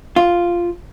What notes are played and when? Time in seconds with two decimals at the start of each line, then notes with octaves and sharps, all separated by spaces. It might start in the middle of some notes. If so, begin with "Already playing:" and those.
0.16 F4